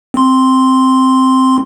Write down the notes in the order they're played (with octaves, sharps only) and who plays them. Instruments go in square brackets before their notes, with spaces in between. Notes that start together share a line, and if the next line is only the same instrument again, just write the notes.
[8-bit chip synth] C4 C6